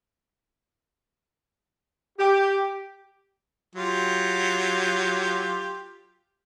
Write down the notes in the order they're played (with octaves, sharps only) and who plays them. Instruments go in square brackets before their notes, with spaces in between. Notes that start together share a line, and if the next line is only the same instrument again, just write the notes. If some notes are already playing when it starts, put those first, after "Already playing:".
[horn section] G4
[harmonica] F#3 F4 G4